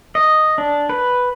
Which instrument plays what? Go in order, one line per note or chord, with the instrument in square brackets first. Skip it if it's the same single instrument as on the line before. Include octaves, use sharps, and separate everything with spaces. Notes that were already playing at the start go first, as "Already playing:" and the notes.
[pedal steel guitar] D#5
D4
B4